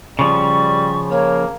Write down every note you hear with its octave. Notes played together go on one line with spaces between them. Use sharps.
C#3 F3 G3 C#6
A#3 C#5